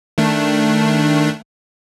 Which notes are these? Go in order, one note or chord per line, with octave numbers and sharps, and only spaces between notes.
D#3 A3 D4